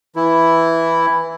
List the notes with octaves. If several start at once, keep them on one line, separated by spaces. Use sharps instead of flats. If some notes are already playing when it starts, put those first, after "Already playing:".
E3 E4